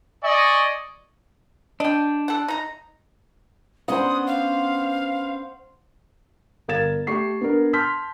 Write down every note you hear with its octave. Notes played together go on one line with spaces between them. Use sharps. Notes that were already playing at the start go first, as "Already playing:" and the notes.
D5 D#5 G#5 C#6
D4 D#5 G5
A4 F#5
D#4 A#5
B3 C#4 D4 C5 F#5 D#6
F5
G1 A#4 F5 G#6 A6 E7
A3 G4 C#6 C7
B3 D4 A#4
A5 C6 F6 G6 B6